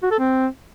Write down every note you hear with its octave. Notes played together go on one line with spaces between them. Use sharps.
F#4
A4
C4